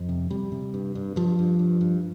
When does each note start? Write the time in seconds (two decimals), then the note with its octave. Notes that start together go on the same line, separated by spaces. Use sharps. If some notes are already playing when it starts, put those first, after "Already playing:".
Already playing: F2
0.09 C3
0.30 C3 G3
0.52 C3
0.74 G2
0.95 G2
1.16 G2 F3
1.39 G2
1.59 G2
1.81 G2